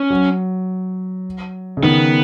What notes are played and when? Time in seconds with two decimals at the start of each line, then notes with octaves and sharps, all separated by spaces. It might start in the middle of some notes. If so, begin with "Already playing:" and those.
Already playing: C#4
0.10 F#3
1.77 C#3
1.83 D#3 B3